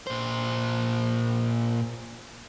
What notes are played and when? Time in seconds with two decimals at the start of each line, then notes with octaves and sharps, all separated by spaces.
0.07 A#2 C5